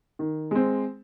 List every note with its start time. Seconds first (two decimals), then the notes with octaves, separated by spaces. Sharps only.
0.19 D#3
0.51 G#3 C4